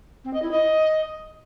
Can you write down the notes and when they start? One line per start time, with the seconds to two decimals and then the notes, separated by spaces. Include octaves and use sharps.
0.25 C4
0.34 D#5
0.42 E4
0.51 D#5